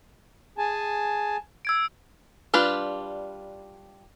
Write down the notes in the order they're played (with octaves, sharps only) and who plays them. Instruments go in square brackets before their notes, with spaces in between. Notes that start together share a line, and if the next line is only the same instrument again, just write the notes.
[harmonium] G#4 G#5 A5
[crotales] E6 G#6 D7
[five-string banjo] G3 D4 F4 B4